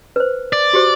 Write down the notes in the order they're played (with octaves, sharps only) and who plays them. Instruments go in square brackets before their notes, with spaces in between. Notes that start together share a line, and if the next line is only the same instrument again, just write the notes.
[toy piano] B4 C5
[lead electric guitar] D5
[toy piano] F#4 G4 C5